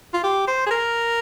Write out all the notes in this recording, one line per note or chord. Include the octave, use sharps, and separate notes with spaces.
F4
G4
C5
G#4
A#4